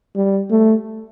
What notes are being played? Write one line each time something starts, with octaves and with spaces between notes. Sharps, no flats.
G3
A3